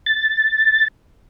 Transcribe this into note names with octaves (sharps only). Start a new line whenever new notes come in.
A6